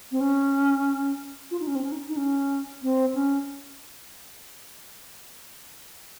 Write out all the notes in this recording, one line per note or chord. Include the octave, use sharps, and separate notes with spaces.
C4
C#4
F4
D#4
C#4
C4
C#4
D#4
D#4
C#4
C4
C#4